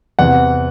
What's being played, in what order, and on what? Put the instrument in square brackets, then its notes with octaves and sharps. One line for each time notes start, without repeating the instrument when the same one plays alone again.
[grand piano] E2 C3 E3 F#5